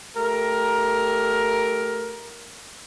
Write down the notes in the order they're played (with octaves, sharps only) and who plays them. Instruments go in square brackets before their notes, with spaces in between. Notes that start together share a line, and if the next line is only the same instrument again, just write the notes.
[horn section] A3 G4 A#4